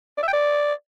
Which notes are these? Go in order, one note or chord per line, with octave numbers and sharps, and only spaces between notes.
D5
E5
G5
D5